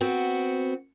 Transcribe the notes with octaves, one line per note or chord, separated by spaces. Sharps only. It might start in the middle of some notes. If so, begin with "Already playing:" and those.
B3 C4 F#4